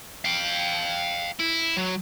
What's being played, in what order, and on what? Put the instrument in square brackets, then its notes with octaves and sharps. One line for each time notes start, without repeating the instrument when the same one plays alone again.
[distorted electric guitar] F5 G5
E4
F#3